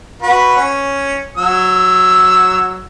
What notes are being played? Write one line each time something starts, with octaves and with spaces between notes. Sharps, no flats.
F#4 B4
C#4
F#3 E6